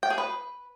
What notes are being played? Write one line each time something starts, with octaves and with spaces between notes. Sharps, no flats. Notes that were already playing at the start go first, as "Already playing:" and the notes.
G5
G#4
B4